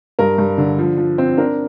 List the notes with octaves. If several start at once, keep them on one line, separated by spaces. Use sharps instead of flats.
G2 A#4
G2
D3
F3
F3
C4
D4 A#4